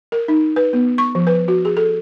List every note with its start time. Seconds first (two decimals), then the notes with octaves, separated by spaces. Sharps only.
0.12 A#4
0.28 D#4
0.56 B4
0.73 B3
0.98 C#6
1.15 F3
1.27 B4
1.48 F#4
1.65 G#4
1.77 A4